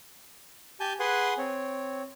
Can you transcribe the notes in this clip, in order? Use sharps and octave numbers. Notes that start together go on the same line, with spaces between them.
G4 G#5 A5 G6
G#4 B4 F#5 G#5 C6
C4 C#5